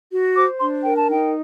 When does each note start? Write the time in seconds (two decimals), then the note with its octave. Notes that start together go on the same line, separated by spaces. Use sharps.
0.13 F#4
0.35 C5 D6
0.60 D4 C6
0.83 A#4 G5
0.97 A5
1.08 D#4 G5